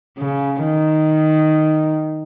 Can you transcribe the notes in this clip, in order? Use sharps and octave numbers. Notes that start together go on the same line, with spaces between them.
C#3
D#3